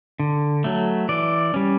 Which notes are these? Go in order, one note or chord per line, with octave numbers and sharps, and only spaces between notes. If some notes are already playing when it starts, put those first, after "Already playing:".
D3
F#3 A3
E3 D5
G3 C#4